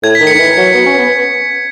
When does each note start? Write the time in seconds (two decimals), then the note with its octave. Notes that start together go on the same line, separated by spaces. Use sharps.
0.03 A2 G#6
0.15 B6
0.20 D#3
0.27 C#7
0.35 D#3
0.39 E3
0.57 F#3
0.74 B3
0.86 C#4
0.98 B3